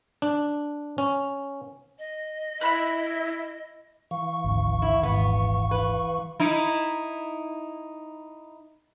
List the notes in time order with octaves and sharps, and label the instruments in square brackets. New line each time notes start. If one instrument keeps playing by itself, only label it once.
[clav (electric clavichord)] D4
C#4
[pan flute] D#5
[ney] E4 [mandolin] E5 B5 F#6
[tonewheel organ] E3 F5 C#6
[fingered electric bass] G#1 D2
[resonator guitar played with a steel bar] E4
[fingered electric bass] D#1 G#1 D#3 [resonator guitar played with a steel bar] B3
[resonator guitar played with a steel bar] B4
[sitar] D#4 E4